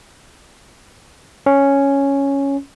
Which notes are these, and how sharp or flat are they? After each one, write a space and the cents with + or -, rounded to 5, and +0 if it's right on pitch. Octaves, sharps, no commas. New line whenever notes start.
C#4 +0